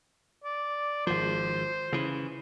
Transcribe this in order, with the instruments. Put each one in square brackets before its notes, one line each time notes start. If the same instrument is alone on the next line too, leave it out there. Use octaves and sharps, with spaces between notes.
[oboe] D5
[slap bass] G#1 F3 [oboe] C5
[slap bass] C#3 E3